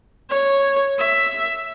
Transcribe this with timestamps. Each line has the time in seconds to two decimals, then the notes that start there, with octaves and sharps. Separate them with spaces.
0.30 C#5
0.99 E5